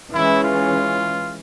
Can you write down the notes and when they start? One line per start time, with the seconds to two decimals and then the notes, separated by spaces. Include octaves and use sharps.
0.14 E3 G#3 C#4 E4
0.44 F4